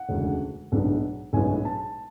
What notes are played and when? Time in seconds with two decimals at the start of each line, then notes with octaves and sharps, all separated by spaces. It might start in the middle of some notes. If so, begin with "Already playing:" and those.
Already playing: F#5
0.09 E1 D2 C#3 G#3
0.72 B1 A2 G#3 B3 D4
1.33 B1 A2 G#3 B3 D4 G#5
1.65 A5